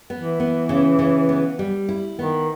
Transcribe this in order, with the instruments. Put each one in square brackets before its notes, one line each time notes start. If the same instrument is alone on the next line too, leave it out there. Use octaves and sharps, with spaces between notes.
[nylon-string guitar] B3
[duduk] E3
[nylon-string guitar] B3
C#3
C#3
B3
G3
E4
[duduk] D#3 [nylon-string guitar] B3